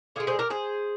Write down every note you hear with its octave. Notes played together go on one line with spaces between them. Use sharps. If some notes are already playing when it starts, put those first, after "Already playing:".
D3 G#3 F4 G#4
G#4 C5
G4 A#4
G#4 C5